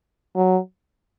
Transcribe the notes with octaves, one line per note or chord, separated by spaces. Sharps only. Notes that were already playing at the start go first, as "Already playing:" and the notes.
F#3